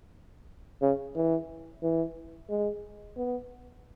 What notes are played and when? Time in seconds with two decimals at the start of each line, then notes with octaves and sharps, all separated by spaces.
0.82 C#3
1.15 E3
1.83 E3
2.50 G#3
3.17 B3